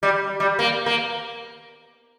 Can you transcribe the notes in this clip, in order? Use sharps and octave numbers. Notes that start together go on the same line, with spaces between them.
G3
G3
A#3
A#3